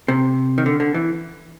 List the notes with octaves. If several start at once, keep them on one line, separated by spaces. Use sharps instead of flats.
C3
D#3
D3
D3
E3